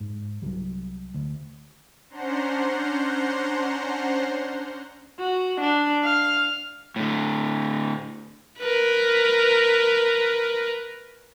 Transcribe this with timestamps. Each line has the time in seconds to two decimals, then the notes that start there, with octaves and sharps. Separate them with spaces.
0.01 G#2
0.42 C2 F#3 G3
1.14 D2
2.10 C#4 D4 C5 F#5 A#5 C6
5.19 F#4
5.60 D4
6.04 F5
6.96 A2 D3
8.59 A#4 B4